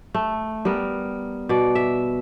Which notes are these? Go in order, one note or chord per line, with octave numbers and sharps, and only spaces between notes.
A3
G3 B3 A#4
B2 D5
E5